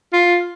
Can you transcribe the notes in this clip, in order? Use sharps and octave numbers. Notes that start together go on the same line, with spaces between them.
F4